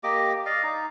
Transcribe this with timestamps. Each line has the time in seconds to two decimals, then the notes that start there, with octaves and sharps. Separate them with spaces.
0.04 A#3 G4 D#5 D6
0.46 D5 D#5 F5
0.63 D#4